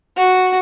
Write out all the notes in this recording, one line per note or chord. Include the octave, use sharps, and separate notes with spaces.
F#4